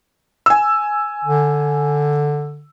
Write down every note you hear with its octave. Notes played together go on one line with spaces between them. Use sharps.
G#5 E6
D3